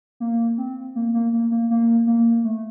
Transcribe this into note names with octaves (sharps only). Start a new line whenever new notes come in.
A#3
C4
A#3
A#3
A#3
A#3
A#3
A#3
A3